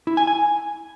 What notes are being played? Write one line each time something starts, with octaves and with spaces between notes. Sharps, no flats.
E4
G#5
G#5